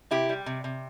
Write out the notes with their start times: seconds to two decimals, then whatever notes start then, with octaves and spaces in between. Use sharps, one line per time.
0.11 C3 E4 G4
0.29 G3
0.46 C3
0.64 C3